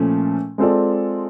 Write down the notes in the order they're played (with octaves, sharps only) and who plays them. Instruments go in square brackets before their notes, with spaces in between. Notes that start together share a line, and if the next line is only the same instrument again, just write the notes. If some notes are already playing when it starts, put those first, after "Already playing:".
Already playing: [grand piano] A#2 F3 A3 C#4
G#3 C4 F4 A4 D5